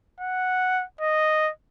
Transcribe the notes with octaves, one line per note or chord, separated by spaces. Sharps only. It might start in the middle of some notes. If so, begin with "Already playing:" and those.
F#5
D#5